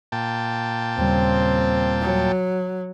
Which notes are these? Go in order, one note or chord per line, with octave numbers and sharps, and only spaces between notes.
A#2 G5 A5
D#2 C#3 G3 C4
F#3